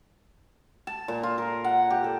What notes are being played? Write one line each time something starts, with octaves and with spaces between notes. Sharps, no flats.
A5
A#2
F4
A#4
F#5
G4
A4